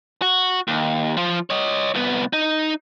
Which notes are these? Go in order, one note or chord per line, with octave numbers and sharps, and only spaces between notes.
F#4
D#2
F3 F4
C#5 D#5
C2 B3
D#4